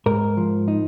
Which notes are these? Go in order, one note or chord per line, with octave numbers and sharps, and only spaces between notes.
G#2 A#4
F3
D#4